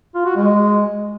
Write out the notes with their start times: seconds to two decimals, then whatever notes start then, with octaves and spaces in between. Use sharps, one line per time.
0.15 F4
0.26 F#4
0.36 G#3